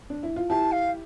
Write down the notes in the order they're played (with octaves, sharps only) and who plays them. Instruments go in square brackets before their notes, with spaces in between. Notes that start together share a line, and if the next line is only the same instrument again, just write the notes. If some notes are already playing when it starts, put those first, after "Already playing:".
[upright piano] D4
E4
F4
[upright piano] E4 G4 [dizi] A5
[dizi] F5